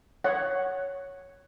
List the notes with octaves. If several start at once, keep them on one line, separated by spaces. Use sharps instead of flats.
C#5 F#5